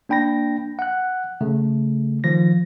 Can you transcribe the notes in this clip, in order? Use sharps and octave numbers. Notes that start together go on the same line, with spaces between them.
A#3 D4 G5 B5 A#6
F#5 F#6
C#3 A3
D#3 F3 A#6